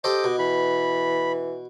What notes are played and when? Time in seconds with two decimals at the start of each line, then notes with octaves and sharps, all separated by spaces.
0.04 G4 A4 C5 D#5 D6
0.24 B2
0.39 E3 B5